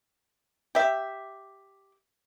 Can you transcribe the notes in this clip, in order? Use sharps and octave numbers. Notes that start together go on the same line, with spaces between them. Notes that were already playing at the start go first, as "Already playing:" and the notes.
G4 E5